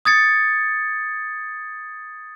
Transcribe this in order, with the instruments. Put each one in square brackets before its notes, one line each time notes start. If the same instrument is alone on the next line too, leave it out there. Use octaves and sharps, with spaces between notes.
[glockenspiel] D#6 G#6 A6 C#7